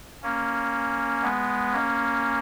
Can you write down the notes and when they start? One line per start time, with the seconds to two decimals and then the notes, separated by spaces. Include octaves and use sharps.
0.23 A#3 C#4
1.23 G#3 B3
1.72 A#3 C#4